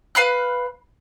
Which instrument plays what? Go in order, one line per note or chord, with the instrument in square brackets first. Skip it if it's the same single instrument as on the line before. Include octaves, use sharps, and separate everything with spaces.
[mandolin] B4 F5 B5 F#6